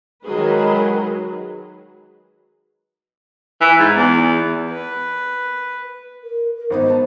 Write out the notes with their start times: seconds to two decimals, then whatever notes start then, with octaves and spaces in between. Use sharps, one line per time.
0.24 D#3 F#3 G#3 G#4 B4
3.61 E3
3.79 G#2
3.96 E2
4.70 B4
6.23 A#4
6.57 A#4
6.70 G#1 B3 D#4 C5
6.88 B3 A5